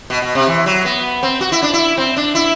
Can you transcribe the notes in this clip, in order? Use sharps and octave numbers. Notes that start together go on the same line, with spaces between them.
B2
B2
C3
E3
F#3
B3
C4
F#4
E4
D4
E4
C4
D4
E4